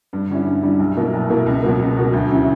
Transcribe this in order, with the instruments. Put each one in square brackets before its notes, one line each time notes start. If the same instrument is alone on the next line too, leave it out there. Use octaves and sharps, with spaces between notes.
[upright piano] G2
D3 G3 C#4 E4
G2
D3 G3 C#4 E4
B1
B2 A#3 E4
B1
B2 A#3 E4
C#2
B2 F#3 A#3
C#2
B2 F#3 A#3
D2
C#3 F#3 C#4 E4